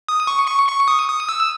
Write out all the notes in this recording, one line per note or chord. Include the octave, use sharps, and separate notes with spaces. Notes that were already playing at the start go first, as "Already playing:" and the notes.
D#6
C#6
C#6
C#6
D#6
D#6
E6